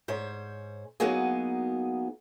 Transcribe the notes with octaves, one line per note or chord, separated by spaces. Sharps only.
G#2 C5 C#5
F#3 A#3 B3 D#4 F#4 G#4